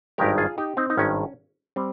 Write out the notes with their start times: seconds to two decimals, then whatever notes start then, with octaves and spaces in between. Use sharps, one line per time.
0.18 G#1 G2 D#3 G#3 G4 A#4
0.38 F4 G#4
0.58 D#4 G4
0.77 C4 D#4
0.90 D#4
0.97 G#1 G2 D#3 G#3 C#4
1.76 G3 C4